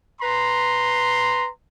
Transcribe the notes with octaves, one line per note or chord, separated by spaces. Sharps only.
B4 A#5 C6